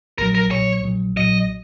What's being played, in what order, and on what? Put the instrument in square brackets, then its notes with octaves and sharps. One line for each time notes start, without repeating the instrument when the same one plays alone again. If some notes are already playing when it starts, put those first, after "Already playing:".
[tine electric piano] A#1 A#2 F#3 [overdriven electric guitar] A#4
[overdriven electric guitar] A#4
[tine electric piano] A#1 A#2 F#3 [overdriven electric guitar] C#5
[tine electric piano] A#1 A#2 F#3
[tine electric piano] A#1 A#2 F#3 [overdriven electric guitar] D#5